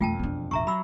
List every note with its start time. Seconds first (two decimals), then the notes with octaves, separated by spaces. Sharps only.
0.01 E1 F2 A3 F4 G5 A5
0.19 B3 D4
0.51 E1 A1 E5 A#5 C#6
0.67 F#3 B5 E6